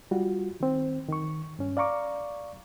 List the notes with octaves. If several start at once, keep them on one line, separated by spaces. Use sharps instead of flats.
G3 F4 F#4
D#3 C4
D#3 C#6
G2 C#4
D5 F5 A#5 C#6 D6